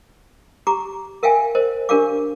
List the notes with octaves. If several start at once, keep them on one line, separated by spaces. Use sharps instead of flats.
G4 A#5 D6
A#4 E5 F5 G5 G#5
A#4 C5 D#5
D4 G4 A#4 D5 F5 D6